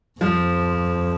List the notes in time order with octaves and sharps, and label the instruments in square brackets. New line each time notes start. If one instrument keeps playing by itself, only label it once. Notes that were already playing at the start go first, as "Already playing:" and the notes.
[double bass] F2 [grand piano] F3